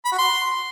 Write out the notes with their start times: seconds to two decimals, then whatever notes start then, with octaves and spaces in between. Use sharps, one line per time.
0.05 B5
0.12 F#4
0.18 C6